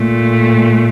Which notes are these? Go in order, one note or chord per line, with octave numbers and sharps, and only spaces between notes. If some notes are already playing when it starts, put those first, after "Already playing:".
Already playing: A#2 A3